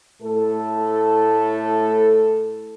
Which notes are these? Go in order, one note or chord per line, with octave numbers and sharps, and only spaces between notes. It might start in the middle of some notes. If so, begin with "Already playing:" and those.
A2 A3 A4